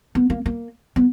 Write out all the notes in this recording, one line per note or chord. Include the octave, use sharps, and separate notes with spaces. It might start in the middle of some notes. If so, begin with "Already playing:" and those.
B3
A#3
A#3
B3